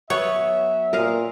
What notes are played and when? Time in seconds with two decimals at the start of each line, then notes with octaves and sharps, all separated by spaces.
0.10 F#3 B3 C#5 E5
0.93 A#2 A#4 D#5 F5